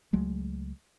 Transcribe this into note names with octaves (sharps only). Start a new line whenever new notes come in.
C#2 F#3 G#3 A3